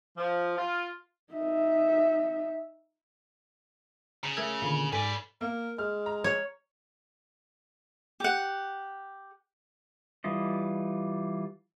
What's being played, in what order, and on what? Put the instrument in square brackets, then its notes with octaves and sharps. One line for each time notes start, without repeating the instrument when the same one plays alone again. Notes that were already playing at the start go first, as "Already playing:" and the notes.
[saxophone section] F3
F4
[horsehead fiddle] D#4 E5
[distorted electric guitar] C#3 [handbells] A#5
[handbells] A3 A#4 G#6 [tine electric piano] E6
[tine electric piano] A#2 D3 D#3 [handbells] F5 B5
[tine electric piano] G#2 [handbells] A4 G#5 [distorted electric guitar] B4 D5
[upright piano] A#3 [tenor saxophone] A#4
[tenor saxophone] G#3 [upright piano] F6
[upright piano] A#5
[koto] C#5
[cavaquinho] G4 F#5
[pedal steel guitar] E3 G3 F4 D#5